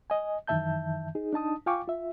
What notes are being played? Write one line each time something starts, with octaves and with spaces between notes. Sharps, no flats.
D#5 G#5
F#2 D#3 E3 E5 A5 G6
D#4 G#4
D4 D#4 A5 D#6
F4 F5 G5 G#5 C#6 D6
F4 E5